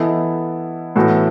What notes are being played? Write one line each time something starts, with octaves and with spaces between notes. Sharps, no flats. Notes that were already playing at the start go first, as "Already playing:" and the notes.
Already playing: E3 B3 E4 A4 D#5
A2 E3 B3 F#4 A4